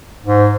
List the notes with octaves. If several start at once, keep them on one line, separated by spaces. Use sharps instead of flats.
G#2